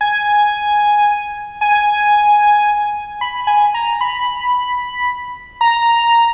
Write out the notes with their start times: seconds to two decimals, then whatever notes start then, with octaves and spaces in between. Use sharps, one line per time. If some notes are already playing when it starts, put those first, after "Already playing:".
0.01 G#5
1.61 G#5
3.21 B5
3.47 G#5
3.74 A#5
4.01 B5
5.61 A#5